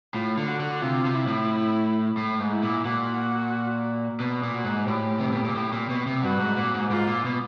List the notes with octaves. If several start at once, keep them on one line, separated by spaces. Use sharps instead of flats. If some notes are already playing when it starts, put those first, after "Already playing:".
A2 F4
D3
F#4
D3
C3 F4
C3
E4
A2
A2
G#2
E4
A#2
A#2 F#4
B2
A#2
F#4
G#2
A2 G4
C3
B2
A#2
A2
A#2
B2
C3
G2 F#4
G#2
A#2
G#2
G#2 F4
A#2
B2